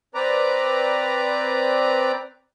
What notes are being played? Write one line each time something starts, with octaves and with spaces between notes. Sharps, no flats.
C4 B4 D5 A#5